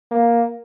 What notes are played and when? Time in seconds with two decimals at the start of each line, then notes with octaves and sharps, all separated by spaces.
0.11 A#3